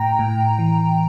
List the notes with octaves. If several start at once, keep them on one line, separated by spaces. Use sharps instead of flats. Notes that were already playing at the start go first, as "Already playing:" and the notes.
Already playing: A2 G5 A#5
A2
E3